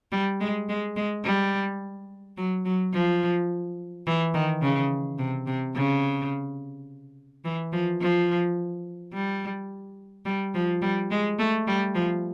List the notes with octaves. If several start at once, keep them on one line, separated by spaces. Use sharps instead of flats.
G3
G#3
G#3
G#3
G3
F#3
F#3
F3
E3
D#3
C#3
C3
C3
C#3
E3
F3
F3
G3
G3
F3
G3
G#3
A3
G3
F3